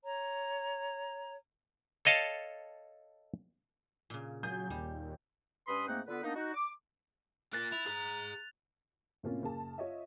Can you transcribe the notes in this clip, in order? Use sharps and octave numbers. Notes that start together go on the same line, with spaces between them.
C#5 A#5
A4 C#5 D#5 F5 A5
A#2 C#3
F#3 G#4 G6
D#2 G3
G2 C#4 B4 B5 C6 D#6
G#2 A3 A#3 C4 D#4 F#5
D3 B3 F4 A4 B4
A#3 B3 D4 D#4
D#4 F#4
D6
F4 A#4 F#6 A6
E4 F7
G#4 A#5
A2 C3 A#3 C#4 F4
F#1 A#3 G#4 A5
F4 C#5 D#5 E5